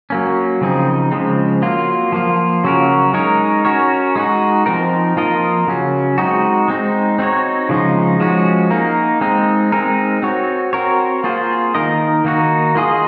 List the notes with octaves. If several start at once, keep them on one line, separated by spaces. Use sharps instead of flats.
F#3 A#3 C#4
C#3 F3 C4 D#4
C#3 F3 G#3 C4
F#3 A#3 F4
F3 A#3 F4
C#3 F#3 C#4 F#4 A#4
G#3 D#4 A#4 C#5
C#4 F#4 A#4 C#5
G#3 D#4 F#4
F3 C4 D#4 A#4
F3 A#3 F4 A#4 D#5
C#3 F#3 C#4
G#3 C4 D#4 F#4
G#3 C4 D#4
C4 D#4 F#4 C#5
C#3 F3 G#3 D#4
F3 G#3 C#4 F#4
A#3 D#4 A#4
G#3 C4 D#4
G#3 C4 D#4 A#4
C4 F#4 C#5
C4 F#4 A#4 C#5
A#3 F4 G#4 C5
D#3 A#3 D#4 A#4 D#5
D#3 A#3 D#4 F#4
A#3 F4 G#4 D#5